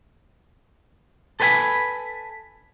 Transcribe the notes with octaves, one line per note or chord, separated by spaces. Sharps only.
A4 B4 C5 G5 G#5 B5